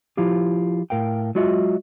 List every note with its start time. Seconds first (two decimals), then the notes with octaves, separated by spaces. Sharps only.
0.17 F3 E4 F4 G4
0.90 A2 A#4 F5 G5
1.35 F#3 G#3 F4 F#4 D#5 E5